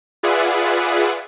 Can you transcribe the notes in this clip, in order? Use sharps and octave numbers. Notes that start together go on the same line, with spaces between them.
F4 G#4 B4 D5 E5 F#5